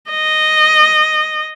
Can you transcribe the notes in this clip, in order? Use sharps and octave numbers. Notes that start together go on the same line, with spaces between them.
D#5